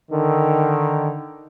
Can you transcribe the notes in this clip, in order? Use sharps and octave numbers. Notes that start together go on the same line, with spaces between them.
D3 D#3